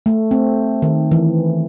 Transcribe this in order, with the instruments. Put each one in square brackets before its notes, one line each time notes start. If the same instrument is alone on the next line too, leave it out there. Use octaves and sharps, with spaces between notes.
[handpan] A3
C4
D#3
E3